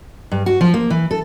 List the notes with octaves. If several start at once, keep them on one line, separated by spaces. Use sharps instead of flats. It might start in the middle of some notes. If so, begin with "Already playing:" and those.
G2
F#4
F3
A#3
E3
A4